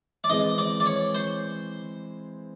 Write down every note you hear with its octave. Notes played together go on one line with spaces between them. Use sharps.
D5
E3 G#3 C4 D#5
D5
D5
C#5
C5